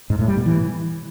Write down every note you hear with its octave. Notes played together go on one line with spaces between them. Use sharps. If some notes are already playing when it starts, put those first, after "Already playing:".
G#2
A2
G3
B2
E3